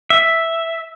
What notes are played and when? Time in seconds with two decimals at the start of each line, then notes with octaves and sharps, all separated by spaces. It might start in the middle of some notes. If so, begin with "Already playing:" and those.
0.10 E5